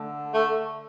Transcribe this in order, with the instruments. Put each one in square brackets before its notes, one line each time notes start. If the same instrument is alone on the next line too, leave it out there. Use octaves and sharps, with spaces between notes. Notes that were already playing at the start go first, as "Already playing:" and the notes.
Already playing: [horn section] D3 A3
A3